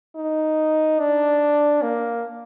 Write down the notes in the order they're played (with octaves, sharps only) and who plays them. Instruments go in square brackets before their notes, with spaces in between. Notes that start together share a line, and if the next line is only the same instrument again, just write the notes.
[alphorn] D#4
D4
A#3